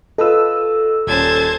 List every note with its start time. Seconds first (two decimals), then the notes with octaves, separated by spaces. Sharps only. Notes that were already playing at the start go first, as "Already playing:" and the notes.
0.18 F4 A4 B4 D#5 E6
1.07 D#1 C#4 C5 A5 G#6